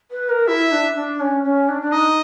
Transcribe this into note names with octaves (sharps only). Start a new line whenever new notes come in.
B4
A#4
E4 E5
D4
D4
C#4
C#4
D4
D4
D#4 D#5